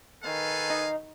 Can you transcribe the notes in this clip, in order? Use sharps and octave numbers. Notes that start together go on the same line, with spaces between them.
D#3 A4 B4 F5 G#5
D#4